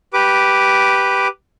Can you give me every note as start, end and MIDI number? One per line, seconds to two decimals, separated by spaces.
0.13 1.28 67
0.13 1.28 71
0.13 1.28 86